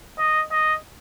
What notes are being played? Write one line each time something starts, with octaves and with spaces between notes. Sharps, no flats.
D#5
D#5